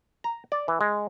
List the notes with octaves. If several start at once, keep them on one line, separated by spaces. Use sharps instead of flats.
A#5
D5
E3
G#3